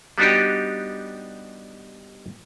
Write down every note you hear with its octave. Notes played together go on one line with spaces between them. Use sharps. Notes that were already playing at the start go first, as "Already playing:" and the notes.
G3 B3 D4 D#4 F#4 G4